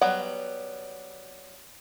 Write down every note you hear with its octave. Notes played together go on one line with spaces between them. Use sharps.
F#3 G3 B3 F#5